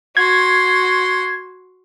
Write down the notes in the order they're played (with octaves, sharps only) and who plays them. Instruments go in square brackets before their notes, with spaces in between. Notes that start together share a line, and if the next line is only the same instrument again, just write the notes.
[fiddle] F#4 C6 [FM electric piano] G#6